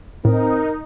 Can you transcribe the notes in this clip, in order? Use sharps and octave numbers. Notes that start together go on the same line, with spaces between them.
A2 C4 D#4 A#4